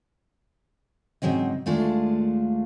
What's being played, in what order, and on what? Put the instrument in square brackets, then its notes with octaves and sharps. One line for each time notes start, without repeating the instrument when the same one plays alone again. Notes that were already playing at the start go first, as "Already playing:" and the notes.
[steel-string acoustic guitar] G#2 C#3 F#3 C4 D#5
D#2 G#3 A3 D4 F4